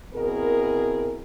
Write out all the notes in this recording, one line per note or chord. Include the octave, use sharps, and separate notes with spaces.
B2 C4 E4 G#4 A#4